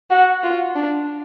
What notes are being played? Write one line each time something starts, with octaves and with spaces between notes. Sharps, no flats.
F#4 F#5
F4
D4